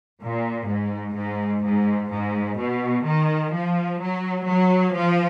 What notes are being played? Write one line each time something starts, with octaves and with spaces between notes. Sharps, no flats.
A#2
G#2
G#2
G#2
G#2
B2
D#3
F3
F#3
F#3
F3